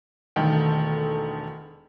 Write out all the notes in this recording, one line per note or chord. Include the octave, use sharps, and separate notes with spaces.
E1 D3 D#3 A3 G5